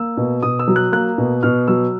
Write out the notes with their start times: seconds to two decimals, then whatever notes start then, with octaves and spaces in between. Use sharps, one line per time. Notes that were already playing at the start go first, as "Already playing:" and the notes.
Already playing: A#3 E6
0.17 B2
0.43 B2 D#6
0.59 E6
0.68 F#3
0.76 F#6
0.92 A#3 F#6
1.18 B2
1.43 B2 F6
1.68 F#3 E6